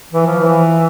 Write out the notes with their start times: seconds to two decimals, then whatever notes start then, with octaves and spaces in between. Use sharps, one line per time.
0.13 E3
0.26 F3
0.39 E3